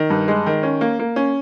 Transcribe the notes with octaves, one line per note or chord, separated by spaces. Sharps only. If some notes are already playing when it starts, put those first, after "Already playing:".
Already playing: D#3
G2
G#3
D#3
C#4
A#3
A#3
C#4